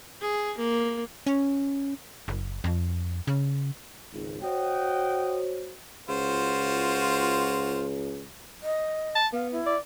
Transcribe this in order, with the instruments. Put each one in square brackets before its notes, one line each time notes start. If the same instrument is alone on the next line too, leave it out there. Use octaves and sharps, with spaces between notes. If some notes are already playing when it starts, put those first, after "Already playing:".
[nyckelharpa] G#4
A#3
[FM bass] C#4
F#1
F2
C#3
[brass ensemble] G#1 C#2
[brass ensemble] F#4 C5 C#5 [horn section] D#5 F#5 G5
[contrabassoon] C#2 [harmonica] F4 F#4 C5
[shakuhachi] D#5
[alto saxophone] A5
[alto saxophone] B3 [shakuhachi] F5
[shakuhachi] E4
[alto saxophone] D5